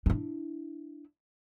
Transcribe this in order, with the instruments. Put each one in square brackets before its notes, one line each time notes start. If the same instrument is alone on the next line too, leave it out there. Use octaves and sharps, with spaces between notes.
[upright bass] D4 E4